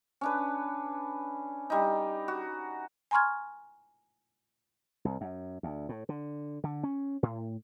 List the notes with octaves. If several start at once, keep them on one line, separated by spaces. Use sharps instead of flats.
C#4 D4 B4
G3 D#4
F#4
G#5 A#5 C6 C#6 F6 G#6
C2
F#2
D2
A2
D3
D3
C#4
A2